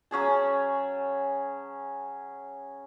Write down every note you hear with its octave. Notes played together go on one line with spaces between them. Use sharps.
F#3 C#4 G#4 A5